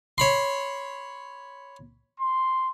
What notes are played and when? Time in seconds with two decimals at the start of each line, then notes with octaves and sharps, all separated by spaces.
0.18 C#5 B5 C6
2.19 C6